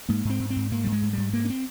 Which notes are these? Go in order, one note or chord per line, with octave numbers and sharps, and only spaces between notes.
G#2 A#3
G#2 C4
G#2
C4
G#2
G#2 A#3
G#2 G3
G#3
G#2
G#2 G3
G2 A#3
C#4
C4